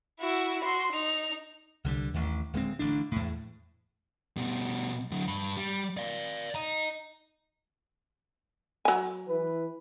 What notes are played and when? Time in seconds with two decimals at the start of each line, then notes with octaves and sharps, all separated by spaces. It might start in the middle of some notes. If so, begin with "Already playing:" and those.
0.19 E4 F#4
0.63 F#4 C6
0.93 D#4 F7
1.84 C2 D3 G3
2.14 A1 D#2
2.53 D1 G#3 C4
2.79 A1 D3 D4
3.12 E2 A2
4.37 B2 G3
5.12 D3 F#3
5.28 G2 B5
5.57 G3
5.97 D5 F5
6.55 D#5 A#5
8.85 F#3 G#5
9.28 E3 B4